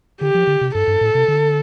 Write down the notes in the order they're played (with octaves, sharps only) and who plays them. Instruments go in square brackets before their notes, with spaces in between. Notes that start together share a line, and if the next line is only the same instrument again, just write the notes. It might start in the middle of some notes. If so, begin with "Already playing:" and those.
[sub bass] D3 [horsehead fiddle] G4
[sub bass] F3
D3
C3
[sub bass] G2 [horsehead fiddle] A4
[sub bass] G2
A2
C3
D3